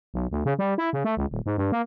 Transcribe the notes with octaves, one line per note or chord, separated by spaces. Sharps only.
B1
D2
C#3
G3
E4
C#3
A3
C#2
D#1
G#2
G2
A#3